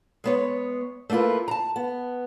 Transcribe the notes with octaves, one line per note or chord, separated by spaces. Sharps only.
G#3 B3 C#5
A3 A#3 E4 F4 B4
A5 A#5
B3